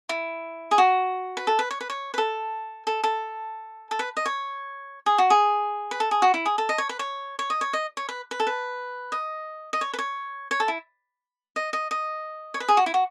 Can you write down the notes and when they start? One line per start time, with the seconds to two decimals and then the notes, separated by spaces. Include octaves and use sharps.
0.09 E4
0.71 G#4
0.78 F#4
1.37 B4
1.47 A4
1.59 B4
1.71 C#5
1.81 B4
1.90 C#5
2.14 B4
2.18 A4
2.87 A4
3.04 A4
3.91 A4
3.99 B4
4.17 D#5
4.26 C#5
5.06 G#4
5.18 F#4
5.30 G#4
5.91 B4
6.00 A4
6.11 G#4
6.22 F#4
6.34 E4
6.46 G#4
6.58 A4
6.69 D#5
6.78 C#5
6.89 B4
6.99 C#5
7.39 C#5
7.50 D#5
7.61 C#5
7.73 D#5
7.97 C#5
8.09 B4
8.31 B4
8.40 A4
8.47 B4
9.12 D#5
9.73 D#5
9.81 C#5
9.94 B4
9.99 C#5
10.51 C#5
10.60 A4
10.68 E4
11.56 D#5
11.73 D#5
11.91 D#5
12.54 C#5
12.60 B4
12.68 G#4
12.77 F#4
12.86 E4
12.94 F#4